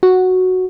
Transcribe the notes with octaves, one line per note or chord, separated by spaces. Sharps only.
F#4